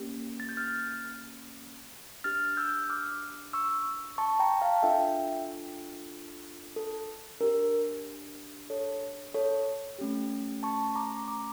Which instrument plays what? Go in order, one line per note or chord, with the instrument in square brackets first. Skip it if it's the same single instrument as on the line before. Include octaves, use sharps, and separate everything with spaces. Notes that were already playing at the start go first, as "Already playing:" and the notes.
Already playing: [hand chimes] A#3 C#4 G4
A6
G6
F6 A6
D4 G4 F6 A6
E6 G6
D6 F6
C#6 E6
A5 C#6
G5 A#5
F5 A5
D4 F4 A4 E5 G5
A4
D4 G4 A#4
A4 C#5
A4 C#5
A3 C#4 G4
A5 C#6
A#5 D6
A#5 D6